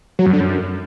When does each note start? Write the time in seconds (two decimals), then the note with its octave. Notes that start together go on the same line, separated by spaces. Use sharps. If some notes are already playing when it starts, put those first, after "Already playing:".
0.19 F#3
0.26 F#2
0.33 D3
0.41 F#2